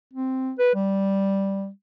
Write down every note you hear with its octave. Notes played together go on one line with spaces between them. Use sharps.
C4
B4
G3